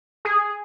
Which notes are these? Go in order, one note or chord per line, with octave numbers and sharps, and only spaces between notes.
G#4